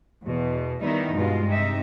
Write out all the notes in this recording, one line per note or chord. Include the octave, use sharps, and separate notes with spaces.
E2 B2
D#3 G3 B3 D#4 E4
G2 B2 G#3 F4
C3 D#4 E5